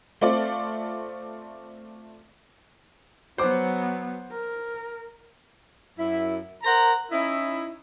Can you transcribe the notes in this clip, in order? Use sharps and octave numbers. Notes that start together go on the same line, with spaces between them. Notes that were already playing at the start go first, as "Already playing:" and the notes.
A3 C4 F4 D5
F#3 B3 C5 D6
A#4
F#2 E4
A#4 C5 F#5 A#5
C#4 D#4 E4